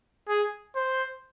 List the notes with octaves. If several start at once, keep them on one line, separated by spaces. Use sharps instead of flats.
G#4
C5